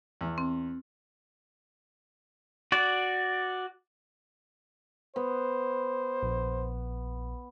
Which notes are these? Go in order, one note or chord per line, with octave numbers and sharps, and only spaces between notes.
E2
C4
F#4 D5
B3 C5
A#1